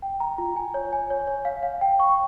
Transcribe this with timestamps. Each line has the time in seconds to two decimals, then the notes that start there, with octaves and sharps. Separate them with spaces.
0.02 G5
0.20 A#5
0.38 F4
0.56 G#5
0.74 C#5
0.93 G#5
1.10 C#5
1.27 C#5
1.45 F5
1.63 F5
1.81 G5
2.00 C#6